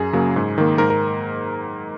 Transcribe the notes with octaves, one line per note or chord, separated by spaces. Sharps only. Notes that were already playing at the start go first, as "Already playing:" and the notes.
Already playing: F#2 G#4
C#3 F#3 A#3
G#2
D#3 A#3
G#2 A#4
A#4